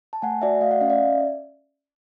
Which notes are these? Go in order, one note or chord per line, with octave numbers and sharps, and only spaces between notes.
A5
A3 F#5 G#5
F#4 D5 E5
A3 D#5 F5
E5 F#5
C#4 D#5 F5
D5 E5